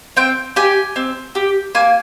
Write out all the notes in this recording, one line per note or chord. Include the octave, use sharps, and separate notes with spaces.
C4 G5
G4 G#5
C4
G4
A#3 G#5